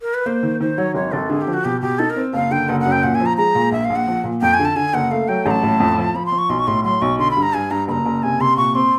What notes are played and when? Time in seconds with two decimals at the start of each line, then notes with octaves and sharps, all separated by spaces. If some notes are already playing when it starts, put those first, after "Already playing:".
0.02 A#4
0.14 B4
0.26 A#3 C5
0.43 D#3
0.60 D#3 C5
0.78 F#3 C#5
0.95 G#1 C#5
1.12 G#1 A4
1.30 D3 G#4
1.41 G4
1.47 F3
1.54 F#4
1.65 B2 G4
1.81 B2 G4
1.99 D#4 A4
2.10 A#4
2.16 C4
2.33 F#1 F5
2.51 D3 G5
2.69 F#1 F#5
2.80 F#5
2.86 F#2
2.92 G5
3.03 A#2 F#5
3.15 G#5
3.20 F3
3.26 A#5
3.37 G#3 A#5
3.55 A#2
3.72 A#1 E5
3.85 F5
3.90 A#1
3.96 F#5
4.07 F3
4.24 A#2
4.42 F2 G5
4.54 G#5
4.59 D3
4.65 A5
4.76 D3 G#5
4.94 F#1 F#5
5.11 A3 F5
5.28 F#3 G5
5.46 A1 A#5
5.51 A5
5.63 A2
5.80 F2
5.98 F3
6.15 F3 B5
6.26 C6
6.32 F3
6.38 C#6
6.49 B1 C6
6.59 C#6
6.67 A2 C6
6.84 F#3 C6
7.02 B1 C#6
7.19 D3 C6
7.31 B5
7.37 G2
7.42 A#5
7.54 G2 G#5
7.71 G2 A#5
7.88 F#1 B5
7.92 A#5
8.06 F#1
8.23 C3 G#5
8.40 C3 C6
8.57 A#2 C#6
8.75 C4 C6